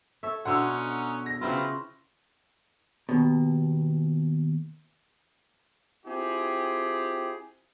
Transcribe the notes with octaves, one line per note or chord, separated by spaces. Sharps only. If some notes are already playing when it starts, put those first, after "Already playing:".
A4 C#5 E5
B2 D3 C#4 D#4 C5 F#5 E6
A#6
C#3 F#3 B3 C4 E4 F4
D#2 B2
C4 E4 F4 G4 G#4